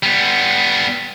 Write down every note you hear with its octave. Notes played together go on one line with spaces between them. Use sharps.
G3 B3